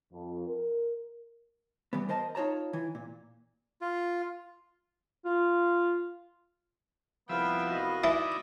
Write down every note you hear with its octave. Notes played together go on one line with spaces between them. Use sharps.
F2
A#4
E3 G3 B3
A#4 C5 D#5 A5
D#4 F4 C#5 A5 A#5
E3
A#2
F4
F4
C2 F3 B3 E5 F5 G5
F#4 D#5
E3 D#4 E4 D5